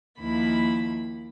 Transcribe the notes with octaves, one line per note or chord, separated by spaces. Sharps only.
D#2 F3 A#3 E4 B5